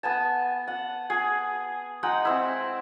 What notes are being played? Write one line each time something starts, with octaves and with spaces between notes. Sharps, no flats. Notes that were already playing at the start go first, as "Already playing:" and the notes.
B3 G#5 A5
F#5
G#4
G#3 D#4 F#5 G5
C4 E4